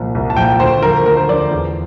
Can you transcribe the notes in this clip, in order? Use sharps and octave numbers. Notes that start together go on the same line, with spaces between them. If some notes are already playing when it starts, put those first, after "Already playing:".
Already playing: C2 A#2 F3
C2
A5
A#2 F3 G5
D2 C5
D3 F3 A#4
D2 A#4
C5
D3 F3 D5
E2